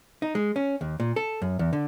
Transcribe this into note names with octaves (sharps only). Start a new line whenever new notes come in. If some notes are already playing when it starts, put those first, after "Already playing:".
D#4
G#3
C#4
D#2
A#2
A4
F#2
E2
D3